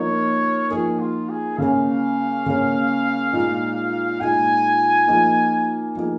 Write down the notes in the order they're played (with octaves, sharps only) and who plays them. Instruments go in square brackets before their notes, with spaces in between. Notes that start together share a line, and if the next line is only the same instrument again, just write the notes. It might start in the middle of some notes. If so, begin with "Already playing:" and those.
Already playing: [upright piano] F3 A#3 D#4 A#4 [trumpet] C#5
[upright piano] F3 A#3 D#4 A#4 [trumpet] G#4
[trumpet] F4
G#4
[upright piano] C#3 A#3 C#4 [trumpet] F5
[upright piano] C#3 A#3 C#4
A#2 G#3 D#4
[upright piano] A#2 G#3 D#4 [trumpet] G#5
[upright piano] F3 A#3 D#4 G#4
F3 A#3 D#4 G#4